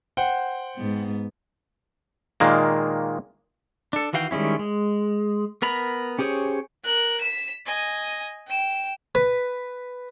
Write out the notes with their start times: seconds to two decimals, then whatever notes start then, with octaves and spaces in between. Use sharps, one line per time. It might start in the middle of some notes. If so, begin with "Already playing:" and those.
0.17 C5 F#5 G5
0.76 G#2 B3
2.40 A#2 D#3 G#3 A#3
3.93 D4 A4
4.13 D#3 E3 F#4 F5 G5
4.31 D#3 G3 G#3 C#4 E4
4.59 G#3
5.62 B3 A#4 A#5 B5
6.19 C#4 G4 G#4 C5 C#5
6.84 A#4 F#6
7.21 B6 E7
7.66 D#5 G#5
8.47 G5 E7
9.15 B4